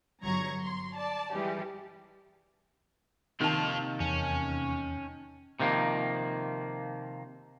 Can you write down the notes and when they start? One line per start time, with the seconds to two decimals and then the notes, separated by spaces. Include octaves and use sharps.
0.23 G1 F#3 A#5 C#6 G#6
0.63 C6
0.96 D5 A5
1.34 E3 G3 G#3 G4
3.41 C3 D#3 A#3 C4 F4 A5
4.00 E2 C#4
5.60 C3 D#3 F3 A#3